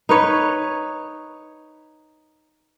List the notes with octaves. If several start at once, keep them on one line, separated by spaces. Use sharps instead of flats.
D#4 B4 C#5